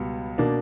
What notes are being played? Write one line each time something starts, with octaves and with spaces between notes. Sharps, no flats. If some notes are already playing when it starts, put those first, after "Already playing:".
Already playing: C#2 B2 G3 B3
B2 A#3 D4